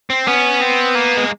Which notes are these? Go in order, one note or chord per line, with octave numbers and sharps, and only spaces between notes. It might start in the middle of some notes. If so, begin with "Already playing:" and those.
C4
B3 C#4
C4
A#3
G#3